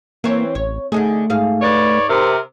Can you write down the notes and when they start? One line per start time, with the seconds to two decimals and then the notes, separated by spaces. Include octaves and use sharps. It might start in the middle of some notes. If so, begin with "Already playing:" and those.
0.24 E3 A#3 C4 C#5
0.55 A1 C#5
0.92 D3 A3 D#4 G#4
1.30 G#2 G#4 F5
1.61 B4 C#5 D5
2.08 C3 A#4